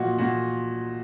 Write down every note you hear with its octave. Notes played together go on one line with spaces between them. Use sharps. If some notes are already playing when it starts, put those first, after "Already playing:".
Already playing: A#2 F3 F#4 D#5 F#5
A#2 F#4